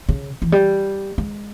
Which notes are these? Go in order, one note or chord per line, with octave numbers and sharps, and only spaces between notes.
C#3
E3
G3
G#3